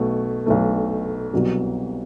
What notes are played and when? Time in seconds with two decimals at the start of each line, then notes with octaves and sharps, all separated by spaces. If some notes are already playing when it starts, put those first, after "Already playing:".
Already playing: B1 B2 A3
0.46 B1 B2 A3
1.33 C2 B2 F#3